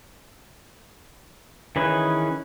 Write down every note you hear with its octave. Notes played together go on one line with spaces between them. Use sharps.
D#3 E3 C#4 G#4 B4